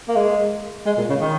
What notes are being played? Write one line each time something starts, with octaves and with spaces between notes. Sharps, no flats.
A#3
G#3
G#3
A#2
C#3
D#3